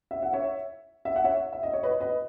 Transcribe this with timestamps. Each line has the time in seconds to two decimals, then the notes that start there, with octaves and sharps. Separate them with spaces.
0.11 E5
0.22 F#5
0.33 C#5 E5
1.05 E5
1.16 F#5
1.24 C#5 E5
1.53 E5
1.63 D#5
1.73 C#5
1.83 B4 D#5
2.00 B4 D#5